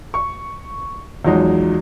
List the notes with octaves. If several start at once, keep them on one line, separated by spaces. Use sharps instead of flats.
C#6
E2 F3 F#3 G#3 D#4